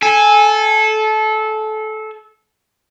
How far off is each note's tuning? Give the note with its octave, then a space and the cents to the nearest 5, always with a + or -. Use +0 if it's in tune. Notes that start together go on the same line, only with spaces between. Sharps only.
A4 -20 G#5 +0